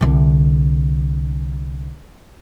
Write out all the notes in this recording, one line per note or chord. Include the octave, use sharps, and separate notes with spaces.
C2 D3